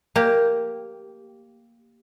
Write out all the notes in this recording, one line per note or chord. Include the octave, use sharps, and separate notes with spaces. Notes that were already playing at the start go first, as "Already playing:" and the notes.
A#3 G4